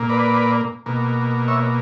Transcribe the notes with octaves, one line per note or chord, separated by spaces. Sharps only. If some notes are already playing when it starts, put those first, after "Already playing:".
Already playing: A#2 A#3
B4 D5
B2 A#3
C#5 E5